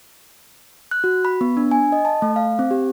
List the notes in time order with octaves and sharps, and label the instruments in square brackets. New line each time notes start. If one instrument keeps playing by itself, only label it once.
[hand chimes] F#6
F#4
B5
B3
D4
G#5
D#5
A5
A3
F5
C4
G4